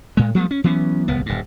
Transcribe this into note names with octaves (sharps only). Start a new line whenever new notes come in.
A2 G#3
F3 G3 A3 B3
C#4
E3 F#3 B3 C#4
D1 C2 B3
D#1 G2